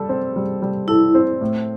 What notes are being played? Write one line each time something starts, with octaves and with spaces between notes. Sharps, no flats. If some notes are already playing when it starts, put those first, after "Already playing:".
Already playing: G3 A4
C4
G3
G3
E4 A4
C4
A2